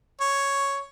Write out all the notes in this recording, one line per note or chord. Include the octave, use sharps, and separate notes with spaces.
C#5